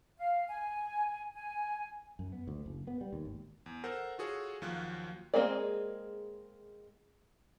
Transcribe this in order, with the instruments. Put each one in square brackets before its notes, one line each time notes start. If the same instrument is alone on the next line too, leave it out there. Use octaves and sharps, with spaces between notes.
[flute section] F5
G#5
G#5
[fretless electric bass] F#2
B3
D2
F#1
B3
G3
D#2
G#1
[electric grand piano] E2
A4 A#4 C5 F#5
F4 F#4 G#4 A4 C#5
D#2 F3 F#3 F4 F#6
[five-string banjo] G#3 A#3 C4 G#4 D5